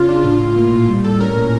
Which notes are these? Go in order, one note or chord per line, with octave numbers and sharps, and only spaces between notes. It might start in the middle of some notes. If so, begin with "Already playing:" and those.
Already playing: C#3 F4
D4
A2 F4
A2
A#3
A#2
G3
A2 A4
C#4 A#4
A#2